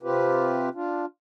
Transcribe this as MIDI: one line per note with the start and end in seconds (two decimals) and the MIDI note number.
0.03 0.69 48
0.03 0.69 60
0.03 0.69 65
0.03 0.69 67
0.03 0.69 71
0.74 1.06 62
0.74 1.06 65